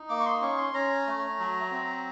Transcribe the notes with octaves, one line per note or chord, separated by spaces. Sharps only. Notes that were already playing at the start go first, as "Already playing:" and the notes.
Already playing: D#4
A#3 D6
C#6
C6
C#4 C#6
C6
C#4 A#5
A3
F#3
C4